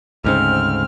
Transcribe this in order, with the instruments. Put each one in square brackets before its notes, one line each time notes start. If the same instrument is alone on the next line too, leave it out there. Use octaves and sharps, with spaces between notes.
[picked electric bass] D2 G#2 C#3 [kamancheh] C4 F6